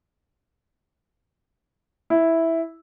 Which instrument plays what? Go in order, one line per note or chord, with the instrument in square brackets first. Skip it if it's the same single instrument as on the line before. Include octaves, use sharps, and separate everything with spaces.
[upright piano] E4